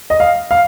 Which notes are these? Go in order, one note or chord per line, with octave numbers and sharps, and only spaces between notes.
D#5
F5
F5